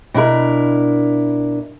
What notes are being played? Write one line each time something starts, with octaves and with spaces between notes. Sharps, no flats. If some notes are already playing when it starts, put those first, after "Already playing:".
B2 D4 E4 A#4